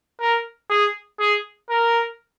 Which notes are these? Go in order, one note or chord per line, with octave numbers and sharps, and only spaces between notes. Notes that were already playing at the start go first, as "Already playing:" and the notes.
A#4
G#4
G#4
A#4